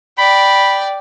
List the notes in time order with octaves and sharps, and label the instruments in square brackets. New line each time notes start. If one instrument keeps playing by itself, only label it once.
[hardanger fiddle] D5 G5 [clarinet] B5